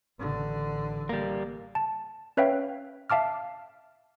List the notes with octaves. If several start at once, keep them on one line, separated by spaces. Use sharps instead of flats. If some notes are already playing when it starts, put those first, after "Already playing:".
A1 D3
G3 A#3
A5
C#4 B4 C#5 E5 F5 G5
E5 F5 A5 D6 F6